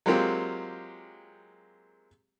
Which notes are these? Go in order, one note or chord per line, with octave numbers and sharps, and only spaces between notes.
F#3 G#3 A#3 C4 F4 G4